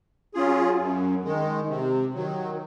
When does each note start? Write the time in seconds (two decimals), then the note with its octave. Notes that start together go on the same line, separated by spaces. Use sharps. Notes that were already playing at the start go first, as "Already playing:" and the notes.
0.34 F#3 C#4 F4 G#4
0.79 F#2
1.24 D#3 G#3
1.69 C3
2.14 D#3 F#3